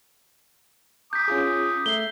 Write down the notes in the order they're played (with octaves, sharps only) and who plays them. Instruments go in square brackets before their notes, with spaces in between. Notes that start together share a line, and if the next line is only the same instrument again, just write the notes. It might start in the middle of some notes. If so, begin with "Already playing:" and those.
[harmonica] A#5 D6 D#6 [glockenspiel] G6 B6
[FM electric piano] C#4 F4 G#4
[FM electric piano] A3 E5 C7 [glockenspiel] G7